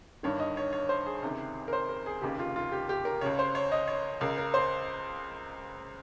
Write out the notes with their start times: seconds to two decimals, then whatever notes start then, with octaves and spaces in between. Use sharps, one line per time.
0.23 G1 G2 D#3 C#5
0.40 D#5
0.57 C#5
0.73 C#5
0.89 C5
1.06 G#4
1.23 C#2 C3 D#3
1.68 A#4
1.73 C5
1.89 A#4
2.06 G#4
2.22 F1 D#2 C#3 G4
2.39 F4
2.56 F4
2.72 G4
2.89 G4
3.05 A#4
3.21 C#2 C#3 C#5
3.39 C5
3.55 C#5
3.72 D#5
3.87 C#5
4.21 C#2 C#3 A#4
4.38 A#4
4.54 C5